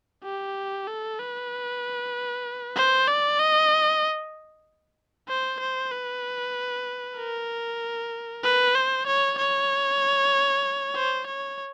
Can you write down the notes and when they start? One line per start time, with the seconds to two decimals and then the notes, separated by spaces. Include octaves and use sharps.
0.24 G4
0.88 A4
1.19 B4
2.76 C5
3.08 D5
3.39 D#5
5.29 C5
5.60 C5
5.91 B4
7.17 A#4
8.44 B4
8.75 C5
9.07 C#5
9.38 C#5
10.96 C5
11.27 C#5